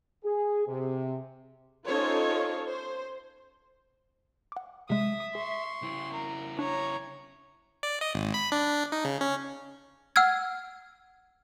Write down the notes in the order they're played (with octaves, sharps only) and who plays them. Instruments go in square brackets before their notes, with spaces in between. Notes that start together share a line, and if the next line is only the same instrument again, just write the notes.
[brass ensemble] G#4
C3
[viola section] C#4 D#4 F4 A4 C5 C#5
C5
[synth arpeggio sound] F#5 D6
[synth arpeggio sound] C3 G#3 [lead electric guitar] E5 [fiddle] D#6
[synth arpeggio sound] G#4 [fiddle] C6 C#6
[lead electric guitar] C#3 E4
[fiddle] A#4
[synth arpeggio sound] D4 [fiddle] C#5 A#5
[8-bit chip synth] D5
D#5
G#1
B5
D4
D#4
C#3
C#4
[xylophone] F#5 E6 F6 G#6